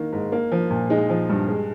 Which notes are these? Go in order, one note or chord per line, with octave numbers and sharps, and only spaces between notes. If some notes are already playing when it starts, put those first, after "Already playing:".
Already playing: D#3 A#3
G#2
A#3
F3
A#2
G#3 D#4
F3
G2
G#3